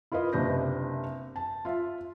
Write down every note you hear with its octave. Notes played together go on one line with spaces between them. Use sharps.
E4 F4 A#4 B4 D#5
F#1 C3 D4 B4 G6 A#6
A5
F4 E5